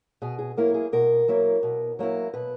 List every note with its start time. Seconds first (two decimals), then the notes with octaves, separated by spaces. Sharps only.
0.22 B2 G#4
0.39 G#4
0.57 F#3 A#3 E4 A#4
0.74 G#4
0.93 B2 A#4
1.28 F#3 A#3 E4
1.63 B2
1.99 F#3 A#3 E4
2.34 B2 B4